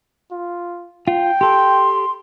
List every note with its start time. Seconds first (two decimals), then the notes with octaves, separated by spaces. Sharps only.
0.32 F4
1.08 F4 G5
1.41 G4 A4 C6